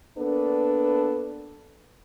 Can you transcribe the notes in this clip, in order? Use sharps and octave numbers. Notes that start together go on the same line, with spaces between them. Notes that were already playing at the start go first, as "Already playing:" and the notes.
A#3 B3 D4 A4 B4